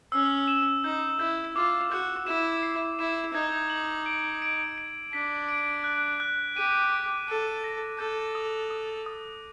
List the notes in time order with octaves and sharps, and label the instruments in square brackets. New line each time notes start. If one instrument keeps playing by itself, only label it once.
[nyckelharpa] C#4 [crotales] E6
[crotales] E7
[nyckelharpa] D#4 [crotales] G6
[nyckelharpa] E4 [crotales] G6
[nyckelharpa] F4 [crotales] D6
[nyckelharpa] F#4 [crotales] G6
[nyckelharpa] E4 [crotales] E7
[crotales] C7
[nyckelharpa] E4 [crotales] E7
[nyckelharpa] D#4 [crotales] G#6
[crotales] F#7
D7
D7
D7
[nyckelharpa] D4 [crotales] B6
[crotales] D7
F#6
F#6
[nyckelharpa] G4 [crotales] D#7
[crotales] D6
[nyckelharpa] A4 [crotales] F#6
[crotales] A#6
[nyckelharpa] A4 [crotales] G6
[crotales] D#6
D#6
D#6